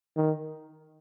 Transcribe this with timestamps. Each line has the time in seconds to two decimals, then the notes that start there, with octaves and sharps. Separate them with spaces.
0.16 D#3